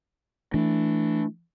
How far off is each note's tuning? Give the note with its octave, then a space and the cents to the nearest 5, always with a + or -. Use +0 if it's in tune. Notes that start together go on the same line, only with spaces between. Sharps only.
E3 +0 A3 +0 D4 +0